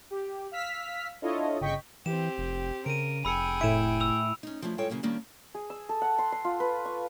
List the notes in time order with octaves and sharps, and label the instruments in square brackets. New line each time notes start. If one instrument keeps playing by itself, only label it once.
[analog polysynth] G4
F5 E6 F6 B6
D4 E4 F4 A4 C#5 D#5
G1 C#3 D#5 G5 C#6 B6
[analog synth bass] E3 [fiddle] C4 G4 [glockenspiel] E7
[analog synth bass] F1
[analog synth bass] C#3 [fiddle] A#4 [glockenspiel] D7 D#7
[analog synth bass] F1 [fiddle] G#4 G5 [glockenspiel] B5 E6 C#7
[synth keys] A2 E4 [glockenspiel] D7 E7
[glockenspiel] E6 F7
[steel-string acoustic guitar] C#4 D#4
F3 F#3 A3 D4 E4
G2 G#3 F4 A4 C#5 G5
C#3 F#3 A#3 C#4
D#3 G3 A#3 C#4 D4
[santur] G#4
E6
A4
F#5
C6
C6
F4
B4
C#6